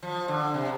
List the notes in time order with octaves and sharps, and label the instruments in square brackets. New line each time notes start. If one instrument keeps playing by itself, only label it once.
[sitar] F3
D3
C3